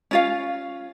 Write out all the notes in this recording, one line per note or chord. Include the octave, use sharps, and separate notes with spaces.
C#4 F4 F5